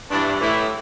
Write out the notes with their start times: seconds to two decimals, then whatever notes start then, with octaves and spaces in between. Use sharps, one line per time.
0.11 G2 E3 D4
0.40 A2 E3 E4